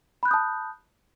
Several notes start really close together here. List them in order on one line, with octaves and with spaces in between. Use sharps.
B5 F#6 G6 D#6 A5